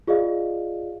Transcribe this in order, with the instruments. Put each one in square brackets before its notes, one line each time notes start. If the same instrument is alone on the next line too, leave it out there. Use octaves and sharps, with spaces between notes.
[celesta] F4 G#4 D5 D#5 F5